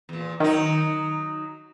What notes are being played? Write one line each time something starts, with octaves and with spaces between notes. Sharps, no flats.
E2 A#2
D#3 F#3 D#4